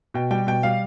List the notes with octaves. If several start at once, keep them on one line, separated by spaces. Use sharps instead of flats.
B2 G5
G3 G5
B2 G5
G3 F5